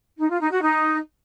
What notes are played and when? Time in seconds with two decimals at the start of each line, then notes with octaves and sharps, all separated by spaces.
0.19 D#4
0.30 F4
0.40 D#4
0.51 F#4
0.62 D#4